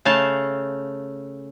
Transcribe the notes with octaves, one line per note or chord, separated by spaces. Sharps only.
C#3 A3 F5 A5